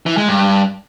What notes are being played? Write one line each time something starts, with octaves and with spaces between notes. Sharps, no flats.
E3
G#3
G2